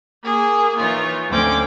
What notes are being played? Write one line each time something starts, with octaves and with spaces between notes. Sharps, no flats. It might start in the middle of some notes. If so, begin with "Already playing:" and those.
A#3 G#4
E3 D#4 F4 C#5
D2 F3 C4 C#4 G5 D6